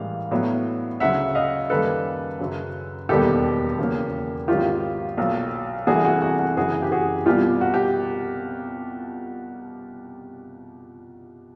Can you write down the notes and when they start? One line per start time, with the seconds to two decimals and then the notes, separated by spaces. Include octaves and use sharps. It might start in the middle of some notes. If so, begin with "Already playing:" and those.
Already playing: A1 G#2 E3 G3 A#3 F5
0.31 A2 F#3 B3 D4
1.00 D2 C#3 F#3 E5 F#5
1.35 D#5 F5
1.70 F#2 D#3 G3 A#3 A4 B4
2.39 F#2 C#3 F#3
3.09 E1 D#2 D#3 G3 B3 G4 A4
3.79 E2 C#3 F#3 A#3
4.48 G#1 G#2 D#3 F#3 F4 G4
5.17 B1 A#2 F#3
5.87 C2 C3 E3 A3 D4 F#4 G#4
6.05 F#4
6.22 F#4
6.39 F#4
6.56 F#1 F#2 C#3 E3 F#4 G#4
6.82 G4
6.92 F#4 G#4
7.26 C2 B2 G3 F4 G4
7.61 F#4
7.74 G4